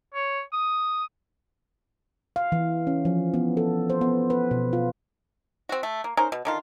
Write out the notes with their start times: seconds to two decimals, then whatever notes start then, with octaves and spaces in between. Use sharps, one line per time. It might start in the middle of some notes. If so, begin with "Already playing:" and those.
0.14 C#5
0.53 D#6
2.36 F5
2.52 E3
2.87 C#4
3.05 F3
3.34 B3
3.57 A4
3.90 C5
4.01 B3
4.30 B4
4.51 B2
4.73 F4
5.69 C4 F#4
5.83 A3
6.04 A#3
6.17 C#4 D#4 A#4 C5
6.32 B2
6.45 D3 D#3 F4